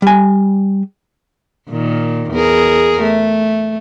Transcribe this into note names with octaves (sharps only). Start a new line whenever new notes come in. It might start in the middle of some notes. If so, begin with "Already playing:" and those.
G3 G#5
A#2 D#3
E2 G#4 A#4
A3